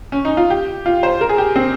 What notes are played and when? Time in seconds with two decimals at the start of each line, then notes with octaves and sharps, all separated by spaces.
0.12 C#4
0.25 D#4
0.37 F4
0.50 G4
0.86 F4
1.03 C5
1.21 A#4
1.29 G#4
1.38 G4
1.56 C4